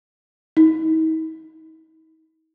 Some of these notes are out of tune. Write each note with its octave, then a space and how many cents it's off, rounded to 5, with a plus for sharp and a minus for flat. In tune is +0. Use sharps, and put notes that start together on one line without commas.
D#4 +45